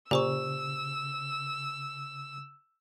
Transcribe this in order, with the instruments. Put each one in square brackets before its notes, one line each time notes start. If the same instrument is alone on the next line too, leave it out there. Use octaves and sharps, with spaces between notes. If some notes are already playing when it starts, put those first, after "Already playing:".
[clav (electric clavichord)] A#2 [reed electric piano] C#3 [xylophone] G4 C5 C#6 [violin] E6